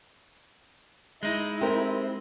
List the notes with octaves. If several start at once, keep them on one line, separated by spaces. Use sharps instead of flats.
G#3 D#4 E4
C4 G4 A#4